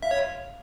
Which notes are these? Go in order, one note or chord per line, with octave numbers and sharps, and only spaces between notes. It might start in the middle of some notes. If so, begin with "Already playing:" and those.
E5 F5
C#5